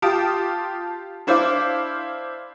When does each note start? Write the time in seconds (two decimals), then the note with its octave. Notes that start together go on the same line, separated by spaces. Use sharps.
0.02 F4 G4 A5 D#6 D7
1.27 D4 E4 C5 F5 D6